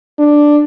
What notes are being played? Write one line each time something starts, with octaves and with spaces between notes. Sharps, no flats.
D4